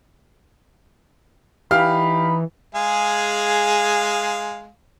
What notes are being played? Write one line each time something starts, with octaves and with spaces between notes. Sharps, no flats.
E3 D#4 G4 F5 B5 F6
G#3 G#4 F5